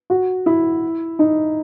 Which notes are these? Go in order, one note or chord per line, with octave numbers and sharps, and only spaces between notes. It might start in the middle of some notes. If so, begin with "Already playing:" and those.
F#4
E4
D#4